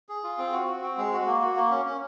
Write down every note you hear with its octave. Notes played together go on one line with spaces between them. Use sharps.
G#4
F4
C4
F#4
F#4
C4
G#3
F#4
A#3
F#4
A#3
C#4
C#4